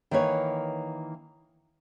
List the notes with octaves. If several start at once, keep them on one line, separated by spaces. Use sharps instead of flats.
D#3 E3 A#3 B4 C#5